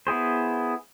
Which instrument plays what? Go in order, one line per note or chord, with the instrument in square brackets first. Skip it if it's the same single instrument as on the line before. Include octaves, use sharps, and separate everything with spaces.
[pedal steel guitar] B3 E4 G#4 C5